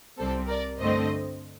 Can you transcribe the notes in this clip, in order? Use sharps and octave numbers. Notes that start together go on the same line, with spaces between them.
C2 C3 G3 C4 A4 C5
A#4 D5
G2 D3 A3 C4 C5 D#5